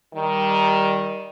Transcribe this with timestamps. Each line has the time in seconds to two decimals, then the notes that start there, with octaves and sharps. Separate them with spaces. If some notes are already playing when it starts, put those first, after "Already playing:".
0.14 D#3 G3